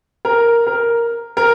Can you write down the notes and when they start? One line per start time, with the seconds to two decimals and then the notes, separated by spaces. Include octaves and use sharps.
0.25 A#4
0.67 A#4
1.37 A#4